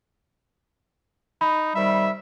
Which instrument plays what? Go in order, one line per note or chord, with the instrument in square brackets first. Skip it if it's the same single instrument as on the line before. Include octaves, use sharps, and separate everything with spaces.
[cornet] D#4 [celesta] B5
[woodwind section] C3 D#3 G3 [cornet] E5